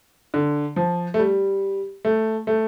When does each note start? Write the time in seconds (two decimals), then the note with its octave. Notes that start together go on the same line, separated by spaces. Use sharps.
0.34 D3
0.76 F3
1.14 A3
1.19 G3
2.05 A3
2.47 A3